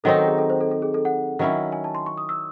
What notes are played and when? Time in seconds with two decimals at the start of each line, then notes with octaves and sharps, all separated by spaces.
0.04 D#3 F#3 C4 D#4 A4
0.16 A4
0.27 G#4
0.38 A4
0.50 C5
0.60 A4
0.71 A4
0.82 G#4
0.94 A4
1.05 F#5
1.39 D#3 F#3 C#4 E4
1.72 G#5
1.84 A5
1.95 C6
2.06 C#6
2.18 D#6
2.29 E6